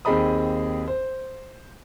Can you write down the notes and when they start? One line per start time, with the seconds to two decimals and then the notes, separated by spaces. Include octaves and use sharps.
0.05 D#2 C4 G#4 D#5 B5 D#6
0.88 C5